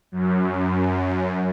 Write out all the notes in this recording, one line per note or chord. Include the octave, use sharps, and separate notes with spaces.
F#2